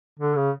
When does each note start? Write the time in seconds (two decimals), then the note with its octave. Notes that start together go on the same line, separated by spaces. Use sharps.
0.20 D3
0.36 C#3